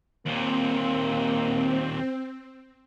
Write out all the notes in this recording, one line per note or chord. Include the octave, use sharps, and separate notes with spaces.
D#2 A#2 A#3 C4